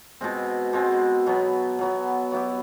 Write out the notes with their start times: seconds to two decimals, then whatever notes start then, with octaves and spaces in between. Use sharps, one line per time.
0.21 B2 G#3 C4
0.73 B2 G#3 C4
1.26 B2 F#3 B3
1.79 B2 F#3 B3
2.31 F#3 B3 E4 G4